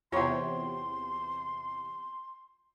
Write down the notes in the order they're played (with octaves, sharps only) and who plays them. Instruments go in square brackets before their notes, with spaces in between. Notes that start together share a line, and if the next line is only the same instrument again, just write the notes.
[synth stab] E2 C3 [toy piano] F4 F#5 [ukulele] G4 C#5 [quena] C6